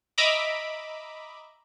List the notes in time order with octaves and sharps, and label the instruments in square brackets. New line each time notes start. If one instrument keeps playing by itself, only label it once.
[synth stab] D#5 E5 A#5 B5 D6